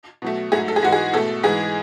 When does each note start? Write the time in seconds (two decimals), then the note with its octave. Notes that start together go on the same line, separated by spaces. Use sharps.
0.22 B2 F#3 A3
0.52 G#2 F#3 A3 G#4
0.68 A4
0.76 G#4
0.82 G#2 E3 G#3 F#4
0.92 G#4
1.13 B2 A3 A4
1.43 G#2 E3 G#3 G#4